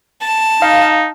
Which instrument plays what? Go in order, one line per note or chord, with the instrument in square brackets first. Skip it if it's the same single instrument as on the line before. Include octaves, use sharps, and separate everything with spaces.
[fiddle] A5
[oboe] D#4 [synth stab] F5